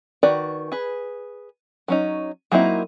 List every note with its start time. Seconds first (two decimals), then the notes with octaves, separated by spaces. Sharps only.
0.23 D#3 F#4 B4 D5
0.72 G#4 B4
1.88 F#3 C#4 D#4
2.52 F#3 A#3 C4 D#4 E4